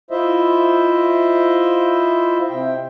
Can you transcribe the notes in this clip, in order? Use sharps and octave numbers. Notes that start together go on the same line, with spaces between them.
E4 F4 C5 D#5 E5
C3 G5